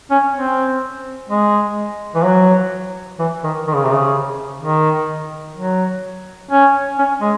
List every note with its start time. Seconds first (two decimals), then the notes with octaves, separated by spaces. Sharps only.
0.11 C#4
0.34 C4
1.29 G#3
2.15 E3
2.24 F#3
3.19 E3
3.43 D#3
3.67 D#3
3.75 C#3
3.84 C3
3.92 C#3
4.62 D#3
5.56 F#3
6.51 C#4
6.99 C#4
7.21 G#3